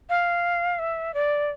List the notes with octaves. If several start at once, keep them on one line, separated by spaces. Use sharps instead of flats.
F5
E5
D5